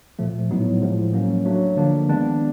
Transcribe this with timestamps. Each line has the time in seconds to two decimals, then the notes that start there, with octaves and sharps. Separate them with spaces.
0.19 A#2 F3 A3
0.51 A2 F#3 B3 D#4
0.82 A2 F3 G#3
1.13 F#3 A#3 C#4
1.45 F#3 A3 D4
1.76 D3 F3 A#3 D4
2.08 D#3 G#3 B3 D4